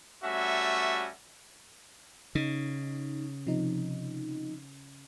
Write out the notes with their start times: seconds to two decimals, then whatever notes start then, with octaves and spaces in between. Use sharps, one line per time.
0.23 G3 A3 C#4 F#4 E5
2.35 C#3 D#4
3.47 C3 F3 D#4